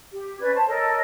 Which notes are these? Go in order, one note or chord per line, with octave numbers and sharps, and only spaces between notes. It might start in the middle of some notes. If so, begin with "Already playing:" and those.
G4
C#4 B4 D5 G#6
C5 A5
A4 A#4 C#5 D#5